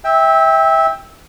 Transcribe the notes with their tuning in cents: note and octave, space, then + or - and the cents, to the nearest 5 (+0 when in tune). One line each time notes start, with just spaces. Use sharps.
E5 -20 G5 +15 E6 +0